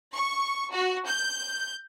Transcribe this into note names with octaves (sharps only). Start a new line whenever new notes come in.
C#6
F#4
G6